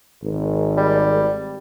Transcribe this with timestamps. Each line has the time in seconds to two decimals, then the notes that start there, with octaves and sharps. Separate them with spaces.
0.23 G#1
0.77 G3